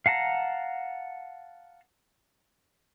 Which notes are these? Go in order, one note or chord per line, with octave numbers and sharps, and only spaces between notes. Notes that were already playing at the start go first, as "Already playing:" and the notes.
F5 F#5 A5 A#5